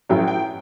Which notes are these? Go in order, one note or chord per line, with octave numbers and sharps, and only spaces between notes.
A1 A2 F#3 C#4 E4 G5
G5